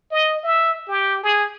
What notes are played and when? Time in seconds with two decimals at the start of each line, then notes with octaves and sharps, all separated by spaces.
0.11 D#5
0.44 E5
0.88 G4
1.23 G#4